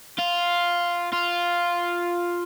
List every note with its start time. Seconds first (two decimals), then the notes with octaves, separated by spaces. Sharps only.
0.18 F4
1.12 F4